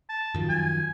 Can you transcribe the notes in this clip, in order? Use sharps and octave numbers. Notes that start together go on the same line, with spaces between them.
A5
F#2 D#3 F3
G#5